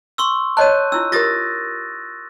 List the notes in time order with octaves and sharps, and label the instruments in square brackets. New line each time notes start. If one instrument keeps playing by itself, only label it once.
[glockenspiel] C6 C#6 E6
[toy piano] C#5 D#5 A5 [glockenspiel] F#6 G6 D#7
[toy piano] D4 E4 F4 [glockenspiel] E6
[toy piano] F4 G4 A#4 [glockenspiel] D#6 A6 A#6